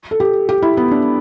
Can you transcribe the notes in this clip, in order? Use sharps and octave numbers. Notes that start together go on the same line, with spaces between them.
A4
G4
G4
E4
B3
D4